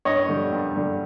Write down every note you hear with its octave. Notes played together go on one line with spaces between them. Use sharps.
G2 C#5 D#5
D3 G3
G2
D3 G3